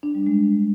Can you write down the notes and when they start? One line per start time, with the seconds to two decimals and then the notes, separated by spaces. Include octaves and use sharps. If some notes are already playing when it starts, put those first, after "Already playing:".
0.03 D4
0.15 G3
0.27 G#3